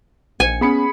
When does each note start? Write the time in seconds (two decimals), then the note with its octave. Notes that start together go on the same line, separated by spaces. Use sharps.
0.40 A#1 G#5 C#7
0.61 B3 C#4 G#4 B5 C#7